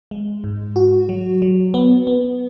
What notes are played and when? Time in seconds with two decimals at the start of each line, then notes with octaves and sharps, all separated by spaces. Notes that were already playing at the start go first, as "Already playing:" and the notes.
0.11 G#3
0.44 G#2
0.76 F#4
1.09 F#3
1.42 F#3
1.74 B3
2.07 B3